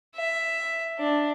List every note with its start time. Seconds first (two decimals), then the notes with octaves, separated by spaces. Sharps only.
0.16 E5
0.99 D4